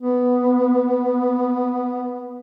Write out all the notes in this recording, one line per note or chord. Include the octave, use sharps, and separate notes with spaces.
B3